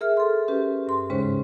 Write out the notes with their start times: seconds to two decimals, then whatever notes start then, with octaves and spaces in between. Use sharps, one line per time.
0.01 G#4 A#4 E5 F6
0.17 A4 C6
0.48 C#4 G4 B4
0.87 G2 C6
1.10 D#2 G#2 C#3 G#3 C#4 C5